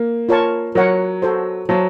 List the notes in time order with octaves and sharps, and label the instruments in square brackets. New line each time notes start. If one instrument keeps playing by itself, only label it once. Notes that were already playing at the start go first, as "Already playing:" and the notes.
Already playing: [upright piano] A#3
[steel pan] F4 A#4 C#5 A5 C#6
[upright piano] F#3 [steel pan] A#4 C#5 F#5
[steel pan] F#4 A4 C5
[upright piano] F#3 [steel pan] C5 F5 A5